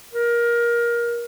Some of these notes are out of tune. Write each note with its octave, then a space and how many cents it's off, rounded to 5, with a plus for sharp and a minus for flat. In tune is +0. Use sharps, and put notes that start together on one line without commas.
A#4 +20